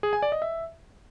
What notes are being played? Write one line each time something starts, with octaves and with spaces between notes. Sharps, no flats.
G#4
G#5
D5
D#5
E5